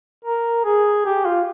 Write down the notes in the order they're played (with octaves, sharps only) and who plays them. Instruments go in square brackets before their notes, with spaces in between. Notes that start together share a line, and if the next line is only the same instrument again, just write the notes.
[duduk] A#4
G#4
G4
F4